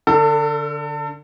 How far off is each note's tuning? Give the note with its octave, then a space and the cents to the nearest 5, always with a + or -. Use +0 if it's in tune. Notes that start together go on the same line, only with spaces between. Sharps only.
D3 -5 A4 +35